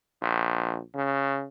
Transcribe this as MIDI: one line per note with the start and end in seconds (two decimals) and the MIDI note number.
0.22 0.80 34
0.95 1.45 49